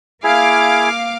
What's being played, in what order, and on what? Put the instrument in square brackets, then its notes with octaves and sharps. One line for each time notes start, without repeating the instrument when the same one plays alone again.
[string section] A#3 F5 D6 [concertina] E4 G#4